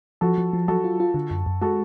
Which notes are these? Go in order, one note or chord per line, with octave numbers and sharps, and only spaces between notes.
F3 F#4 A4
F3
F3
F#3 F#4 A4
F4
F4
D3
F#2
F#2
G#3 F#4 A4